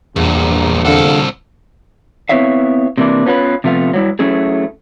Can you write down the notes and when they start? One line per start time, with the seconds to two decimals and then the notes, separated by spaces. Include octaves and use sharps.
0.16 A#1 E2 G2 A#2
0.85 C2 D3 A4 F5 F#5
2.29 B3 C4 E4 C#5 E5 F5
2.98 C3 E3 A#3 D4 E4
3.26 B3 C#4 F4 A#4 B4
3.64 C3 F3 A3 B3 F5
3.93 F#3 G3 E4
4.19 F#3 A3 C#4 E4 G#4